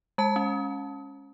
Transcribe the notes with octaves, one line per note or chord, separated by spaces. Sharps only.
G#3 A5
C#4